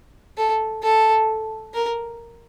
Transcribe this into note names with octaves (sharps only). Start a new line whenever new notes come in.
A4
A4
A#4